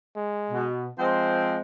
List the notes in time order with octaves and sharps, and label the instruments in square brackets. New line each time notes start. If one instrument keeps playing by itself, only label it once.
[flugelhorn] G#3
[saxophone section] B2
[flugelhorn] F3 [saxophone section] G#3 C4 C5